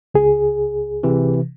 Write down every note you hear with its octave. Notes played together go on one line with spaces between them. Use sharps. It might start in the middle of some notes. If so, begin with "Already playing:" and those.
C#2 G#4
C3 E3